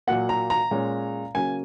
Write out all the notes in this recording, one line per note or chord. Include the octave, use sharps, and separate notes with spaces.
A#2 F#3 A#3 F#5
A#5
A#5
A#2 G#3 C#4
C#3 F#3 A#3 C#4 G#5